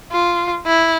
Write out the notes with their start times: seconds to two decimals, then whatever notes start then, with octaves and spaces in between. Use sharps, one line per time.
0.11 F4
0.66 E4